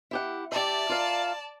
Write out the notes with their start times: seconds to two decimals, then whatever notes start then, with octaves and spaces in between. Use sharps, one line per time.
0.11 E4 G4 F#5
0.52 G4 D5 E5 A5
0.89 F4 A#4 F5